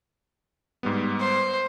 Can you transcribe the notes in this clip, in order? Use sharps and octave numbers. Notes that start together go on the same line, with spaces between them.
G#2 G3 B3
C5